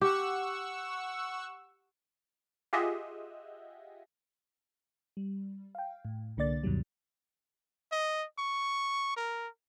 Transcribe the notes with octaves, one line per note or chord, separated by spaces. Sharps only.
G4 F#5 C#6 E6
F4 G4 G#4 D#5 E5 F#5
G3
F5 G5
A2
C2 D3 A#3 D5 A6
D2 G2 B2 D#3 F#3 G3
D#5
C#6
A#4